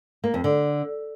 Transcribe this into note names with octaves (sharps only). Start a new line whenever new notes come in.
A#3
F2
D3